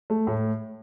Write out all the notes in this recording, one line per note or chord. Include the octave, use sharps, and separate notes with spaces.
A3
A2